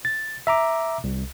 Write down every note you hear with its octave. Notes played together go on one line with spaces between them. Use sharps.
A6
E5 A#5 D6
C2